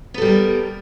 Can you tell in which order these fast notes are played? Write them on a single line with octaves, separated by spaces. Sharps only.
B3 A4 G3 A#4